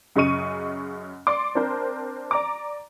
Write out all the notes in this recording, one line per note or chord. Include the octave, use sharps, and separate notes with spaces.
F#2 C#3 D#5 C#6 D#7
D5 C6 D6
C4 D4 A#4 C5
D5 A#5 D6